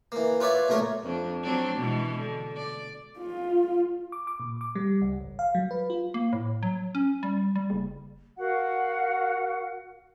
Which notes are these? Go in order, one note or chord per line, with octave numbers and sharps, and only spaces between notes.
E3 A#3
F4 B4 C#5 D5 E5
B1 A#2 A3 A#4 C#5
F2 D4
F#3 C4 D4
B2 E3 G#3
D3
D5
F4
D6
D6
A#2
D6
G3
C#2
G#1
F5
F#3
B4
F4
A#3
A2
F#3
C#4
G3
G3
F#1
F#4 A#4 F5 F#5